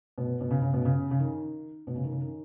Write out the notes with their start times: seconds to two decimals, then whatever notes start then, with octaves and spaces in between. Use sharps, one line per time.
0.18 B2
0.41 B2
0.51 C#3
0.62 C#3
0.73 B2
0.85 C#3
1.11 C#3
1.19 D#3
1.87 B2
1.96 C#3
2.04 D#3
2.12 C#3
2.21 D#3